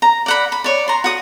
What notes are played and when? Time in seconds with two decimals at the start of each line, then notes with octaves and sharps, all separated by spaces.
0.02 A#5
0.26 D5 F#5 B5
0.52 B5
0.64 C#5 D5
0.88 A#5 C6
1.04 F#4 D#6